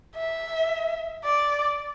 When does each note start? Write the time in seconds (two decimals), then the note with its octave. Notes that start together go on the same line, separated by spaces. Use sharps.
0.16 E5
1.25 D5